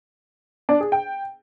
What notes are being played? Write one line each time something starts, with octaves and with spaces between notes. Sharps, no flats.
D4
G#4
G5